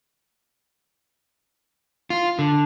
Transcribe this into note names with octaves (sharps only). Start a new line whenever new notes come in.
F4
D3